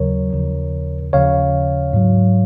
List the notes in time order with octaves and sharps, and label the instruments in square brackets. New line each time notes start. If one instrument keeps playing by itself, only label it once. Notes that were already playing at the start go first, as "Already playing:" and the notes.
Already playing: [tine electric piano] D#2 C#3 F#3 A#4 C#5
D#2 C#3 F3
D#2 C#3 F3 C#5 F5
G#2 F#3